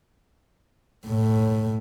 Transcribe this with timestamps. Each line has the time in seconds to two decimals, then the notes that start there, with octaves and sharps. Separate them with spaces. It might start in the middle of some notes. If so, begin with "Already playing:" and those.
1.07 A2